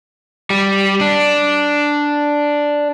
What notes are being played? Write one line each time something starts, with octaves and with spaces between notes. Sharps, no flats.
G3
D4